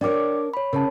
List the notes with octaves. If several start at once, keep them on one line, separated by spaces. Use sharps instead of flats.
D4 A#4 C#5 D5 G5 D6
C#5 B5
C#3 A#4 C#5 A5